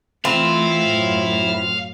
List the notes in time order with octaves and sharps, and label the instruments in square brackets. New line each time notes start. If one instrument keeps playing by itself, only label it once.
[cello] E3 A3 [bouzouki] C4 F4 [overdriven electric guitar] E4 [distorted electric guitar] F5
[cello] F#2 A2